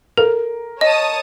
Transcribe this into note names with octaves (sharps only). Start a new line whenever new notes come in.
A4 A#4
C#5 D#5 A5 D#6